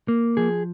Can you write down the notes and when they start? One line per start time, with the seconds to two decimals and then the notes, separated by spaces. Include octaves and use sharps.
0.08 A#3
0.37 F3 G#4